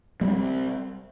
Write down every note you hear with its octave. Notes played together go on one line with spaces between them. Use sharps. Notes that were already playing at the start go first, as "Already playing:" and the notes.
G3 G#3 C4 C#4